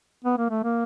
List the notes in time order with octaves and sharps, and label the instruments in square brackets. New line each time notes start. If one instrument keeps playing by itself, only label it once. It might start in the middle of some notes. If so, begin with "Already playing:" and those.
[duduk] B3
A#3
A3
A#3